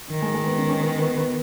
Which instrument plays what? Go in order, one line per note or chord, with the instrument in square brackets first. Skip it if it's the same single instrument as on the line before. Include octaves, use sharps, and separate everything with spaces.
[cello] D#3
[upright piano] G#3
G#3
B3
C#4
C#4
B3
B3
B3